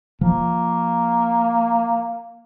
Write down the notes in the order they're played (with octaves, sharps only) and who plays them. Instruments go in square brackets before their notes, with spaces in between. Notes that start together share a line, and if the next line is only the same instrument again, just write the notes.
[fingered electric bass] F3 [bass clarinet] A#3